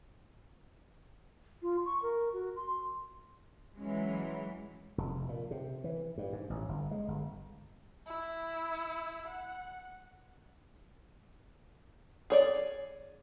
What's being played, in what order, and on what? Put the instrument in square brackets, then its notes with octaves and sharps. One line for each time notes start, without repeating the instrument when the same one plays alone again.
[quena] F4
C#6
A#4
F#4
C6
[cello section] E3 F#3 G#3 C#4
[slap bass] F1
A#2
C3
E3
G2
G#2
A1
G1
G#3
G1
[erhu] E4
F#5
[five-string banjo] G#4 C#5 D5